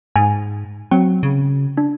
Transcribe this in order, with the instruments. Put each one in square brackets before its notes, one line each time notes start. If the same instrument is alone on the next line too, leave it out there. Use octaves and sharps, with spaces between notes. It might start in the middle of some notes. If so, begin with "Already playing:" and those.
[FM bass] G#2 [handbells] G#5
[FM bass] F#3 [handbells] C4
[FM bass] C#3
[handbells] D4